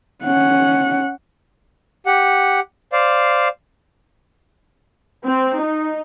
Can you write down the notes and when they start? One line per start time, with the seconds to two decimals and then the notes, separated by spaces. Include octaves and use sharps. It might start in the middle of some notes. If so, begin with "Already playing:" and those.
0.24 C#4 F#5
2.06 G4 F#5
2.92 C5 D5 F5
5.26 C4
5.60 D#4